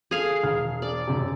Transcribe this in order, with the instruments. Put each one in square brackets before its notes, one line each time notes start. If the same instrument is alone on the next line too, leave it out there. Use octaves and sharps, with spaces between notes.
[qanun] G#4 F5 [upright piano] A4
[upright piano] E1 F6
[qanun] D5
[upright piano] E1 F#2 C3